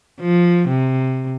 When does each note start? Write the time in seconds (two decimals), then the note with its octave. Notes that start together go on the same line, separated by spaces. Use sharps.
0.20 F3
0.68 C3